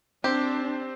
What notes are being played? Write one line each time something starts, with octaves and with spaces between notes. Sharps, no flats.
C4 D4 G4 C5